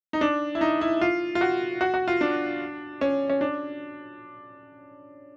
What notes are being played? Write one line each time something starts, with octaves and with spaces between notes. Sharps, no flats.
D#4
D4
E4
D#4
E4
F4
F4
F#4
F#4
F#4
F4
D4
C#4
C#4
D4